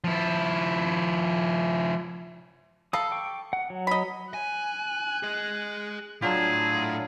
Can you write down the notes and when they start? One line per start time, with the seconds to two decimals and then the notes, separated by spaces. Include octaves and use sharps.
0.04 F3 E4
2.93 A4 F5 B5 D#6
3.12 G5 C#6 D6
3.53 F#5
3.70 F#3
3.87 D#5 B5
4.34 G#5 F#6
5.23 G#4 D#5
6.22 A2 F#3 D4 F4 G#4 A5